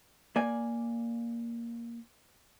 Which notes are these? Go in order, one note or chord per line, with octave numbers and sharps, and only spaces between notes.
A#3 D5 G#5